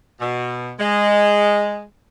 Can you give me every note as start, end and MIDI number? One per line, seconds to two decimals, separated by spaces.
0.20 0.71 47
0.79 1.82 56